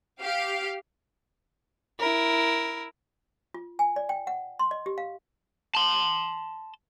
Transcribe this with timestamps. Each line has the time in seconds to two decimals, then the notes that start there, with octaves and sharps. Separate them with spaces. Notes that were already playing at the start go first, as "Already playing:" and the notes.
0.20 G4 F5
1.99 E4 A#4
3.54 F4
3.79 G#5
3.96 D5
4.09 G5
4.27 F#5
4.59 C6
4.71 D#5
4.86 G4
4.98 F5
5.75 A5 C6